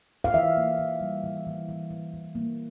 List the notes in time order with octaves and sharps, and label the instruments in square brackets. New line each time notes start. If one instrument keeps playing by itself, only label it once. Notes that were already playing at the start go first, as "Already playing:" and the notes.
[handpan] F5
E3 E5
A#3
E3
G3
E3
E3
E3
E3
E3
A#3